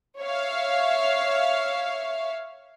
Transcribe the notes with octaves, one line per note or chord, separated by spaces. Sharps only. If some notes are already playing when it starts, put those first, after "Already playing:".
C#5 E5 F5